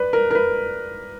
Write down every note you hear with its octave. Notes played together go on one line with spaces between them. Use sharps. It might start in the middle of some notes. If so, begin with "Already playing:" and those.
Already playing: B4 D5
A#4
A#4
B4